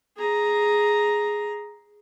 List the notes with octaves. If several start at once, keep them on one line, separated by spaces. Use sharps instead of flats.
G#4 A#5